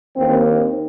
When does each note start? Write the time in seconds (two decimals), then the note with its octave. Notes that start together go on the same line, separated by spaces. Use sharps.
0.15 D#2 D#3 A#3 C4
0.44 D#4